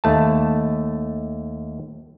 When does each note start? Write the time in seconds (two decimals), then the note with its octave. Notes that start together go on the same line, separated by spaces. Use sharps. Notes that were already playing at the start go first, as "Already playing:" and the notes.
0.04 D#2 A3 A5